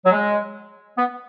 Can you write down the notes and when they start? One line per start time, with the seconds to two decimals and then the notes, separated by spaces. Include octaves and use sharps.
0.06 F#3
0.12 G#3
0.98 B3